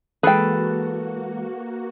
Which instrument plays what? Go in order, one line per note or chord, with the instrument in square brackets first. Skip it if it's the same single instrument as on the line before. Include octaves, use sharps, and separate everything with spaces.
[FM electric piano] E3 G#3 [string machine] A#3 F#4 [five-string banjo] G#4 G5 [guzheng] A4 B4